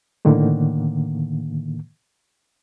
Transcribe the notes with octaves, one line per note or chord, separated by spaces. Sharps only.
A2 D3 D#3 A#3